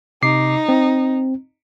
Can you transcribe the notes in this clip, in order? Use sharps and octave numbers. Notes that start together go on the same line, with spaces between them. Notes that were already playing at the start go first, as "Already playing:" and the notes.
C3 D#4 D6 C7
C4